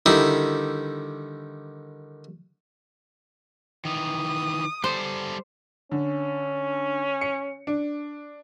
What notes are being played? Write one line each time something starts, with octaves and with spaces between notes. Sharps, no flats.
D3 D#3 G3 D#4 E4
D#3 E3 D#6
G3 A4 C5
D3 C#4
C#7
D4